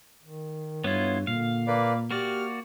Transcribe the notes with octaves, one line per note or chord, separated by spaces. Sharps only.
D#3
G2 B3 E4 F4 C#5
A#2 D3 F5
A#3 B4 D5
A#3 F#4 G4 D5 F6